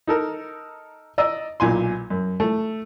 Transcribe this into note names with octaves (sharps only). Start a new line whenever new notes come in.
D#4 A4 A#4
D5 D#5 A#5 E6
B1 A#2 G#5 C6
F#2
A3